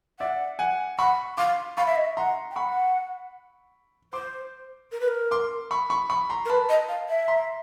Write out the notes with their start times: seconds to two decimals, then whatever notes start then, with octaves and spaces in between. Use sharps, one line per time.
0.20 D5 E5 F#5
0.59 F#5 G#5
0.98 F#5 B5 C#6
1.37 F5 C6 D6
1.77 F5 B5 C#6
1.86 E5
1.96 D#5
2.05 E5
2.17 F#5 A#5 C6
2.51 G5
2.56 F#5 B5 C#6
4.13 C5 C6 D6
4.92 A#4
5.00 B4
5.08 A#4
5.31 C6 D6
5.71 B5 C#6
5.90 B5 C#6
6.10 B5 C#6
6.30 A#5 C6
6.45 A#4
6.50 B4 A5 B5
6.69 D#5
6.89 F5
7.09 E5
7.28 A#5 C6